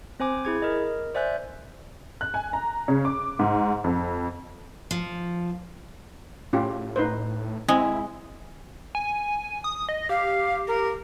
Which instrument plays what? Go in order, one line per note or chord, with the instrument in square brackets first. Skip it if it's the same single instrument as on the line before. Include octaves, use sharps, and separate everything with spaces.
[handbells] C4 C5 G#5 D6
E4 G#4 G#6
A#4 D#5
C5 D5 E5 G#5 F#6 G6
[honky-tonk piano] F#6
G#5
A#5
C#3
D6
G#2
F2
[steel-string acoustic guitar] F3
[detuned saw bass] A2 [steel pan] C#4 F4 G4
[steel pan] D#4 B4 C5
[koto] G#3 [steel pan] C4 [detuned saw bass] E4
[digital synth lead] G#5
D#6
D#5
[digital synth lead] G4 [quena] F5
[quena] A#4